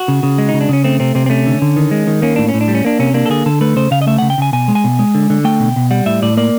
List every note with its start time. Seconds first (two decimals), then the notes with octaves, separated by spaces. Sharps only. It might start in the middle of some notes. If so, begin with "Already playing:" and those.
Already playing: F#4
0.08 C#3
0.23 C#3
0.38 G#3
0.49 C#3 D#4
0.61 D4
0.69 C#3 C#4
0.84 A3 C4
1.00 C3 C4
1.15 C3 C4
1.26 C4
1.30 A3 C#4
1.46 D3
1.62 D3
1.76 D#3
1.91 G#3
2.07 D#3
2.22 A#3 C#4
2.36 A2 D4
2.48 C#4
2.54 A2
2.61 D4
2.68 G3
2.75 C#4
2.85 A#3 D4
2.99 C3 C#4
3.14 A#3 D4
3.26 A4
3.29 D3 G#4
3.46 D3 A4
3.61 A3 B4
3.76 C#3 C5
3.91 C#3 F5
4.02 D#5
4.07 A3 E5
4.18 C#3 F#5
4.30 G5
4.38 C#3 G#5
4.53 B2 G#5
4.68 G#3
4.75 G#5
4.84 B2
4.99 G#3
5.14 D3
5.30 D3
5.44 A3 G5
5.60 B2
5.76 B2
5.91 G3 F#5
6.06 A2 E5
6.22 A2 D5
6.37 A#3 D5